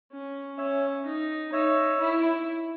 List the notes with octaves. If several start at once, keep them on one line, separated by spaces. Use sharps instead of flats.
C#4
C#4 C#5 E5
D#4
D#4 C#5 E5
E4